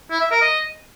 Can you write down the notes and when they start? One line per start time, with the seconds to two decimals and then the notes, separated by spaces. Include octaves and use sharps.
0.11 E4
0.21 E5
0.31 A#4
0.41 D#5